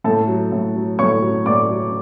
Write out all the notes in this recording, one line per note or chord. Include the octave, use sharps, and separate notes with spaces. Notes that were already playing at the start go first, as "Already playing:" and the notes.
A2 A4 A5
F#3
A2
F#3
A2 C#5 C#6
F#3
A2 D5 D6
F#3